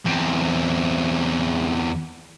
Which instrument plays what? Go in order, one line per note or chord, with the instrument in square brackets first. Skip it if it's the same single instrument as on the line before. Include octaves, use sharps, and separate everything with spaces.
[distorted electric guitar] E2 C4